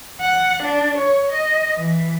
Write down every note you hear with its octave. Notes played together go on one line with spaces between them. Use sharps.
F#5
D4
C#5
D#5
E3